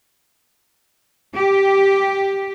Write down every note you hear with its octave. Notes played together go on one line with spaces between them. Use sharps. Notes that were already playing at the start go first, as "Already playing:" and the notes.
G4